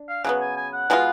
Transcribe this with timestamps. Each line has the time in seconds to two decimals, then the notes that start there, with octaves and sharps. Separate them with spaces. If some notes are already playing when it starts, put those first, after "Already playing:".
Already playing: D4
0.09 F5
0.24 C#3 F#3 B3 F#5
0.41 G#5
0.57 G#5
0.73 F#5
0.90 B2 G#3 B3 F4